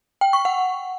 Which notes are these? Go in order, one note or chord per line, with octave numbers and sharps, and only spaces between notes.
G5
C#6
F#5